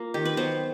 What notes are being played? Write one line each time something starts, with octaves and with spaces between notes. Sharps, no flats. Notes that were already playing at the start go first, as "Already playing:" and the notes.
Already playing: A#3 F4
D#3 G4
B4
F#3 B3 C5